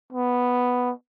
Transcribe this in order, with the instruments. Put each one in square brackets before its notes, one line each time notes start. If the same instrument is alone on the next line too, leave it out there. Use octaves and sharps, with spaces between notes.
[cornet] B3